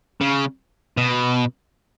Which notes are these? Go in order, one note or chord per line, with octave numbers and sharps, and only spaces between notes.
C#3
B2